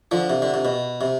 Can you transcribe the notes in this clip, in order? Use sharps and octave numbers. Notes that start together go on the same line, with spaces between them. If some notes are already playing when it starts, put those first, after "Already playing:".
D3 F3
C3
D3
C3
B2
C3